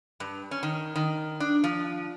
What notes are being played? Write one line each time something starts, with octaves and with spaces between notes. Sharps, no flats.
G2
C#4
D#3
D#3
D4
F3